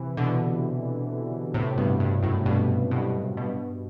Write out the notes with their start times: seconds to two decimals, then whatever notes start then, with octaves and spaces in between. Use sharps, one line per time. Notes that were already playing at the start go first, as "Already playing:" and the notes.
Already playing: C3 E3
0.17 B2 D3
1.54 A2 C3
1.77 G2 B2
2.00 G2
2.23 F#2 A2
2.46 G2 B2
2.91 G2 B2
3.37 G2 B2